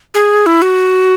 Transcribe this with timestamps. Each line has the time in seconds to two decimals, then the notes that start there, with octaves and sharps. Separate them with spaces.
0.14 G#4
0.46 E4
0.62 F#4